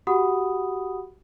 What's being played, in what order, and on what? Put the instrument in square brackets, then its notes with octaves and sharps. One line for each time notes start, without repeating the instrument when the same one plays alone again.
[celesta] F#4 G4 F#5 B5 D#6